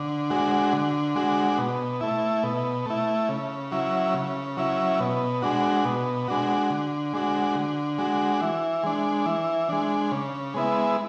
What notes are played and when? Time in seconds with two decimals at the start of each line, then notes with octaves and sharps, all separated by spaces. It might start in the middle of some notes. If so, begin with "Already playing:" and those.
Already playing: D3
0.30 G#3 D4 F#4
0.73 D3
1.16 G#3 D4 F#4
1.58 B2
2.01 A3 E4
2.43 B2
2.86 A3 E4
3.29 C#3
3.71 F#3 C#4 E4
4.14 C#3
4.57 F#3 C#4 E4
5.00 B2
5.42 G#3 D4 F#4
5.85 B2
6.28 G#3 D4 F#4
6.70 D3
7.13 G#3 D4 F#4
7.56 D3
7.98 G#3 D4 F#4
8.41 E3
8.83 G#3 D4
9.26 E3
9.69 G#3 D4
10.11 C#3
10.54 G#3 B3 E4